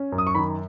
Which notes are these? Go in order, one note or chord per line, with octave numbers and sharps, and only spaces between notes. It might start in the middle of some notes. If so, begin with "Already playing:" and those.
Already playing: C#4
F#2
D#6
C#6
D#3 B5